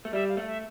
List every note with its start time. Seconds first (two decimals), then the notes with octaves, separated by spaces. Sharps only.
0.05 A3
0.13 G3 E5
0.29 F5
0.37 A3
0.46 E5